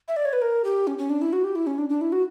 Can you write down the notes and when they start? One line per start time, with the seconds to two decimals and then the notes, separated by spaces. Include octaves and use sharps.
0.08 E5
0.17 D5
0.25 C#5
0.33 B4
0.42 A#4
0.64 G4
0.87 C#4
0.98 C#4
1.10 D4
1.22 E4
1.33 F#4
1.44 G4
1.56 E4
1.67 C#4
1.78 D4
1.89 D4
2.01 E4
2.12 F#4